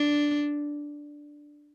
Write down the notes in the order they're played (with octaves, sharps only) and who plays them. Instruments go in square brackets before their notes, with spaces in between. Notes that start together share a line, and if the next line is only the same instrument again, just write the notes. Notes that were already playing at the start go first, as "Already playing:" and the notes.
Already playing: [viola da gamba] D4